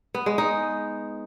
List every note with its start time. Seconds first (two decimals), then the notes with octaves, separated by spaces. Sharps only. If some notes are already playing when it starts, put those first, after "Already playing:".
0.14 B3
0.26 G#3
0.38 D#4